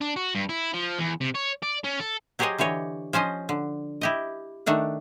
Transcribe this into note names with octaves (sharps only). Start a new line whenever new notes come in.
D4
F#4
G2
E4
F3
E2
C3
C#5
D5
C#4
A4
F#3 G4 G#4 C5 C#5 D#5
D3 E3 G4 C#5 D#5
F3 C#4 C5 D#5
D3
E4 G4 D#5
D#3 A3 D4 F#5